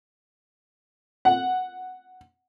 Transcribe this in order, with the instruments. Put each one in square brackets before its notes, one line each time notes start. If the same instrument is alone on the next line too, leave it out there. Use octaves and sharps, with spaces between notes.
[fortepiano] F#5